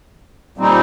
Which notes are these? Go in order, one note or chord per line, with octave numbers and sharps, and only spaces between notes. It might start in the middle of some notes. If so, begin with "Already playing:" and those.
A#2 G3 C4 D#4